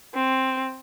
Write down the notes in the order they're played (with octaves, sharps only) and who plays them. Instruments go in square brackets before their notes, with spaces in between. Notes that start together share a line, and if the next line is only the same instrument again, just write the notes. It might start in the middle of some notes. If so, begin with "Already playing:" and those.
[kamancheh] C4